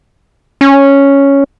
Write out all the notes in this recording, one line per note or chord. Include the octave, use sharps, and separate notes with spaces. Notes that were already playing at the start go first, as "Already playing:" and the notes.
C#4